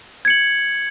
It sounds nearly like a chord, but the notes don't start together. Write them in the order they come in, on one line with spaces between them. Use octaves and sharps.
G#6 C#7 F#7